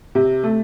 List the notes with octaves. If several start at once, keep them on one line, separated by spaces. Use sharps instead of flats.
C3
A3